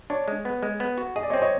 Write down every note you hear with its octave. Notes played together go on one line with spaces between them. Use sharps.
D4 C#5
G#3
B3
G#3
B3
F#4
G#4 D#5
D5
C#5 D#5
C4
C#5 D#5